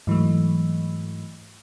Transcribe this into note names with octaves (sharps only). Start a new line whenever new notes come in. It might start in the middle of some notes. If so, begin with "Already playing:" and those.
G#2 E3 F#3 A3